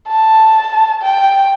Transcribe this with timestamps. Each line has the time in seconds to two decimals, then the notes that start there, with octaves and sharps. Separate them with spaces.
0.08 A5
1.03 G5